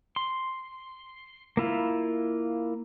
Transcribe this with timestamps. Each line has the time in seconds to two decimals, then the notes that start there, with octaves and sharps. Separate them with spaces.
0.16 C6
1.57 A#3 E4 F4